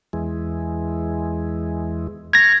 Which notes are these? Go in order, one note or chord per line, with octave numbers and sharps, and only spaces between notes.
E2 E3 G#3
A#5 C#6 F6 G#6 A#6